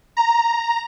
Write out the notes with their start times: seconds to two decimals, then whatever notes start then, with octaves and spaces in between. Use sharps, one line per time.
0.17 A#5